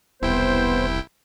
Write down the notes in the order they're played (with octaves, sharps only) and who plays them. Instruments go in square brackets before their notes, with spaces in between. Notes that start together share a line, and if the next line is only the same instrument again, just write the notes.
[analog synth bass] E1 [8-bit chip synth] C2 E4 G5 [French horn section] B3 [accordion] C5